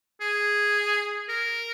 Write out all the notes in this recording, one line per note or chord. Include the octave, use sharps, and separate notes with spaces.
G#4
A#4